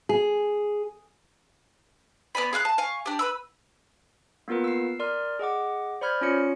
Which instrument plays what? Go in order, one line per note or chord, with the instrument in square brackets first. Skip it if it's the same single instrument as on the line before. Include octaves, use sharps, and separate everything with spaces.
[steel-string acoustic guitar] G#4
[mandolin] B3 D5 G#5 B5
G#4 F5 F6 F#6
A5
F5 G#5 C#6
D4 G4
B4 B5 E6
[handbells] A#3 B3 F4 A#4 B4
E6 C7
A#4 D5 C6 F6
G#4 D#5 F#5 D6
C5 D5 B5 F6 G6 G#6
C#4 F4 C#5 C#7